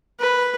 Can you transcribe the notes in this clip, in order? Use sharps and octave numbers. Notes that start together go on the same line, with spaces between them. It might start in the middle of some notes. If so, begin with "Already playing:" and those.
B4